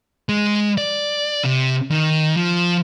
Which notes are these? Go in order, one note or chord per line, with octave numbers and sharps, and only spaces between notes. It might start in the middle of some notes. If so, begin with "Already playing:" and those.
G#3
D5
C3
D#3
F3